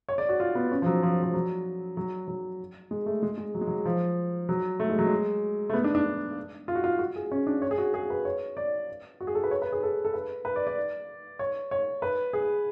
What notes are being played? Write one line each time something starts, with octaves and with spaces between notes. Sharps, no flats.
C#5
D5
F#4
F4
B3
C#4
F3
F#3
F3
F3
F#3
F#3
F#3
G#3
A3
G#3
G#3
F#3
G#3
F#3
F3
F#3
A3
G#3
F#3
G#3
A3
B3
D4
D4
F4
F#4
F4
F#4
G#4
C#4
D4
C#5
G#4
F#4
G#4
B4
C#5
D5
F#4
G#4
A4
B4
C#5
B4
G#4
A4
A4
B4
B4
D5
D5
C#5
C#5
B4
G#4